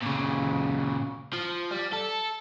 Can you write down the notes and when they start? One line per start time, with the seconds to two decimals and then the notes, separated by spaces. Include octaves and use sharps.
0.02 A#2 C#3
1.33 F3
1.71 G3
1.93 A4